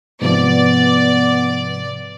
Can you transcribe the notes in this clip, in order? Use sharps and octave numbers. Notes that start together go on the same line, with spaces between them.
G#2 C3 F3 B3 D5